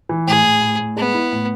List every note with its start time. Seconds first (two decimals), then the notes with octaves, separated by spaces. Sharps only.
0.09 E3
0.27 A2 G#4
0.44 A2
0.61 A2
0.79 A2
0.97 G#3 B3
1.14 E4
1.32 A2